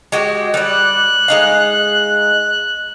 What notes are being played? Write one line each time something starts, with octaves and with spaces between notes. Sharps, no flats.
G#3 F#4 G4
G3 D5 F#6
G#3 D#4 F5